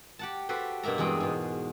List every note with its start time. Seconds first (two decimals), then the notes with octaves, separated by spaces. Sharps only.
0.19 G4 F#5 A5
0.49 F#4 G4 A4 B4 C5
0.83 G2 B2 A#3 E5 A#5
0.98 E2 G2 G#3 C4 G#4 G5
1.20 G#2 B2